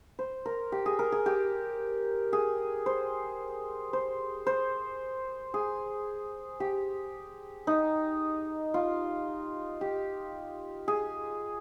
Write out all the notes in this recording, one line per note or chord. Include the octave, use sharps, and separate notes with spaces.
C5
A#4
G4
G#4
A#4
G#4
G4
G#4
C5
C5
C5
G#4
G4
D#4
F4
G4
G#4